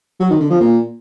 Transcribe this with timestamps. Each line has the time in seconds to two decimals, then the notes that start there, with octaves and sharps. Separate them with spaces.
0.20 F#3
0.30 D#3
0.40 D3
0.50 F3
0.60 A#2